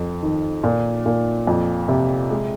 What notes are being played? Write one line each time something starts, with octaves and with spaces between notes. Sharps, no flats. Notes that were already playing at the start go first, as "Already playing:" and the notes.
Already playing: F2
D#3
A#2
A#2
F2
C3
G#3